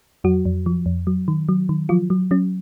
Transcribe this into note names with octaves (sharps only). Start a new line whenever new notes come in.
F2 F#3 F#4
F2
F3
F2
F#3
D#3
F#3
D#3
F3 F#3 F4
F#3
F#3 C#4